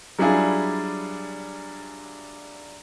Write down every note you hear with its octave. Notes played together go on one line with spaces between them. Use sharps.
F#3 G3 D4 E4 F4 G#4